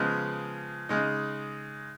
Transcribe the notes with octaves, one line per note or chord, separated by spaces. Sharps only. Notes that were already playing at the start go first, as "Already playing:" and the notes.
Already playing: C#3 F3 G#3 B3
C#3 G#3 D#4